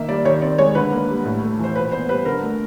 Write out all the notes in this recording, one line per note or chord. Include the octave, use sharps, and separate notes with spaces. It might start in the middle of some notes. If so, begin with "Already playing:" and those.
Already playing: D#3 A#3 E5
G3 D5
D#3 C#5
C4 D5
G#3 C#5
D3 B4
A#3
G3
A2
A3
E3 C5
A#2 B4
B3 C5
G3 B4
D3 A#4
A3